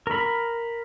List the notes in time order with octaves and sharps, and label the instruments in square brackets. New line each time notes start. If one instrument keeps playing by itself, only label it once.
[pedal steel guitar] A#4 B5